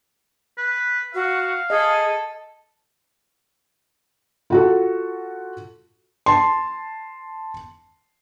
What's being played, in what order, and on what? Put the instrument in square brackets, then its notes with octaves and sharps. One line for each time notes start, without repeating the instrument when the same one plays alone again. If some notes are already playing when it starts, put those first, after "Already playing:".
[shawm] B4
[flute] F#4 [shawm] F5
[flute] G#4 [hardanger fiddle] A4 [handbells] D#5
[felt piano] F4 F#4 A4
A5 C6